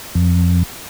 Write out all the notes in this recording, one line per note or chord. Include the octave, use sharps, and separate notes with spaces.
F2